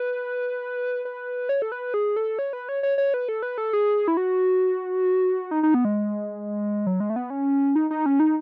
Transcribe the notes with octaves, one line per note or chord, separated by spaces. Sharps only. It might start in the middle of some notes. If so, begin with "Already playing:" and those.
Already playing: B4
B4
C#5
A4
B4
G#4
A4
C#5
B4
C#5
C#5
C#5
B4
A4
B4
A4
G#4
E4
F#4
D#4
D#4
B3
G#3
F#3
G#3
A3
B3
C#4
D#4
D#4
C#4
D#4